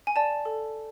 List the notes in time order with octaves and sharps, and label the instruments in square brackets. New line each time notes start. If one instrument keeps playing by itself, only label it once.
[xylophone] G#5
D5 A5
A4